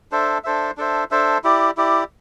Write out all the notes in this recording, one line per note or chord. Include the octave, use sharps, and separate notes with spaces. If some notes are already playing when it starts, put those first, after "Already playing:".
D4 A4 C5 E5
D4 A4 C5 E5
D4 A4 C5 E5
D4 A4 C5 E5
E4 G4 D5
E4 G4 D5